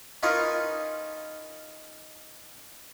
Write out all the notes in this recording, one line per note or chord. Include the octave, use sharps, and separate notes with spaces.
C#4 D#4 F4 A#4 B4